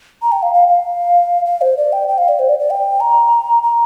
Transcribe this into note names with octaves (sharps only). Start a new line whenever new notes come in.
A#5
G5
F5
F5
F5
F5
C5
D5
G5
G5
F5
D5
C5
D5
D5
G5
A#5
A#5